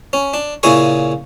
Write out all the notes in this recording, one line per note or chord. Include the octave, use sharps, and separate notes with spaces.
C#4
D4
A#2 C#3 E4 G#4 G#5 C#6